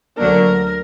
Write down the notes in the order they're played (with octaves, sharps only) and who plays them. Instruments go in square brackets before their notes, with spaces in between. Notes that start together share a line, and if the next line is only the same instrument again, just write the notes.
[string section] D2 D3 F#3 A#3 D4 [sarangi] A#4